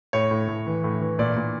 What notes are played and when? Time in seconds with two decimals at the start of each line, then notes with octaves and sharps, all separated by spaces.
0.13 A2 C#5
0.31 A2
0.48 A2
0.66 E3
0.84 A2
1.01 E3
1.19 A#2 D5
1.37 A#2